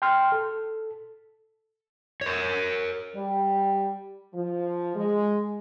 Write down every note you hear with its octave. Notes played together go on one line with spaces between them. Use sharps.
G5 C6 F6
A4
A#4 C#5
G3
F3
G#3